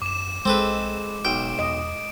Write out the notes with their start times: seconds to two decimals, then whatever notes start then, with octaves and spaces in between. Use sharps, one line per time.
0.02 F#2 D6 E7
0.45 A#1 G#3 C4 A4 B4
1.25 F1 B1 G5 D7
1.59 E2 D#5